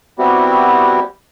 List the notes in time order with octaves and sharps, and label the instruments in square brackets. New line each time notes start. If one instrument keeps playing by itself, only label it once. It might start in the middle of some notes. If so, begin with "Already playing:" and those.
[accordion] G3 B3 C4 E4 F#4 G4